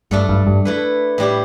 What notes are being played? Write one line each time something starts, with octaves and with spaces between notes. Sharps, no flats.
G2 A3 D4 A4
G2
G2
A3 E4 B4
A2 G3 E4 G4